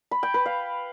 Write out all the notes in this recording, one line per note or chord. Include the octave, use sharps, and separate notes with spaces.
B5
G5
B4
F5